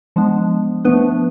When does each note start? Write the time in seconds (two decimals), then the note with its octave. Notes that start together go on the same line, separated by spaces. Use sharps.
0.16 F3 G#3 B3 D4
0.85 F3 A3 B3 D4 B4